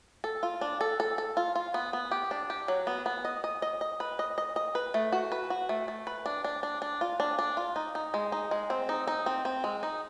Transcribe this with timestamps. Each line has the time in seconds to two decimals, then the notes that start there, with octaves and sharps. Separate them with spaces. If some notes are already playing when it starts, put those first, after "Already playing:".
0.24 A4
0.43 F4
0.61 D4
0.81 A4
1.00 A4
1.18 A4
1.37 F4
1.56 F4
1.74 B3
1.93 B3
2.11 G4
2.31 D4
2.50 G4
2.68 F#3
2.87 B3
3.06 B3
3.25 D#5
3.44 D#5
3.62 D#5
3.81 D#5
4.00 B4
4.19 D#5
4.38 D#5
4.56 D#5
4.75 B4
4.94 A3
5.12 F#4
5.32 B4
5.50 F#4
5.69 A3
5.88 A3
6.07 B4
6.26 D4
6.44 D4
6.63 D4
6.82 D4
7.01 F4
7.20 D4
7.39 D4
7.57 F4
7.76 D#4
7.95 D#4
8.14 G#3
8.32 D#4
8.51 G#3
8.70 C4
8.89 D#4
9.07 D#4
9.26 C4
9.45 C4
9.64 G#3
9.83 D#4